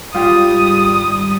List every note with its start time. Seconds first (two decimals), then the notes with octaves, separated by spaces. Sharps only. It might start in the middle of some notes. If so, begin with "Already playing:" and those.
0.14 G#1 G3 F4 G4 D#6